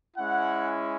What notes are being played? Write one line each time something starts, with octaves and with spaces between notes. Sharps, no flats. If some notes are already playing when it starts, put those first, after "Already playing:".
G#3 C#4 E4 F#5